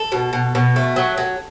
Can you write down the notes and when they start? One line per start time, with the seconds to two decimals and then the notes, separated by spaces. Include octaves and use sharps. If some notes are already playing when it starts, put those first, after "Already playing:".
Already playing: A4
0.12 B2
0.33 B2
0.55 B2
0.76 A3
0.96 F#3
1.18 F#3